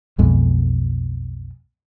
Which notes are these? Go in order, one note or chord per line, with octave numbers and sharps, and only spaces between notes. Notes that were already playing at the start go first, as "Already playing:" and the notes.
B1 F2 B2 G#3